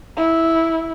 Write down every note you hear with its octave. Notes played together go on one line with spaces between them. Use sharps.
E4